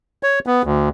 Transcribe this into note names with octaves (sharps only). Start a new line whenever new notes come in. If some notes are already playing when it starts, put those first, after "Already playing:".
C#5
B3
D2